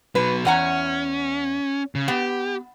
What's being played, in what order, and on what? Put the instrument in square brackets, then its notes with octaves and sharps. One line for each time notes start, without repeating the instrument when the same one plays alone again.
[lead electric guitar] B2 F#3 [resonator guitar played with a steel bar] B4
[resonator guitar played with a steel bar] E2 F#5 A#5 [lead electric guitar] C#4
[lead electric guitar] C#3
[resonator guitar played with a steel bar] B3 [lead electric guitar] G4